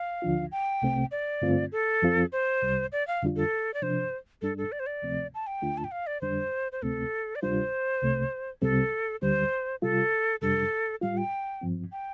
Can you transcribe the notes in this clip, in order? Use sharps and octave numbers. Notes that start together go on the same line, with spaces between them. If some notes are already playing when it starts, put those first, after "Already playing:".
Already playing: F5
D2 D3 F3 D4 F4
G5
C2 C3 A3 C4
D5
G2 D3 A3 C4 F4
A4
F2 F3 C4 F4
C5
C2 C3 G3
D5
F5
F2 D3 G3 D4 F4
A4
D5
C3 F3 D4 C5
G2 G3 D4 A4
A4
D5
C5
D5
D2 C3 F3 A3 C4
A5
G5
D2 D3 A3 D4 F4
A5
G5
F5
D5
F2 D3 G3 D4 C5
C5
D2 C3 A3 C4 A4
D5
D2 C3 G3 D4 F4 C5
C2 C3 A3
C2 C3 G3 C4 A4
D2 D3 G3 C5
C3 G3 F4 A4
F2 C3 G3 D4 A4
A2 G3 F4 F5
G5
G2 F3 C4
G5